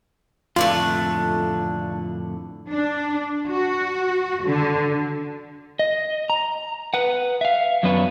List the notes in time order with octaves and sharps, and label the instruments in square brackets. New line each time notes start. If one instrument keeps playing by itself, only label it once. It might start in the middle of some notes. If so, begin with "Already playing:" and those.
[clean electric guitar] F2 A2 D3 [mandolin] A3 A#3 D4 [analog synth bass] F4
[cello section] D4
F#4
D3
[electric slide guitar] D#5
A#5
B4 F#5
E5 F5
F#2 F#3 B3 D4 B4 C#5